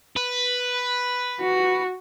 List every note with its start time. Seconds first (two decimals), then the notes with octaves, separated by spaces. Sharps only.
0.16 B4
1.40 F#4